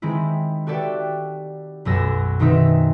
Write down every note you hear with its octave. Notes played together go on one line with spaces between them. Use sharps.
D#3 G#3 C4 E4
F#4 G4 A4 D5 E5 G5
B1 F#2 E6 A#6
B2 D#3 C4 D#4 E5